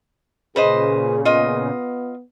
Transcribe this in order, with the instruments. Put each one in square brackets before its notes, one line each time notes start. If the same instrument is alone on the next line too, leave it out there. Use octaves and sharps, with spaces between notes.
[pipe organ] A#2 C#3 [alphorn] G#4 [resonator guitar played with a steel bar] B4 C5 D#5
[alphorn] B3 [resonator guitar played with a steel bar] F4 D#5